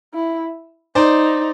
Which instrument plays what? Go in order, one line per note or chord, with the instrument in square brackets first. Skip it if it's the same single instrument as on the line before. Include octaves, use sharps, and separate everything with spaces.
[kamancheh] E4
[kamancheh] D#4 [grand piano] C5 D5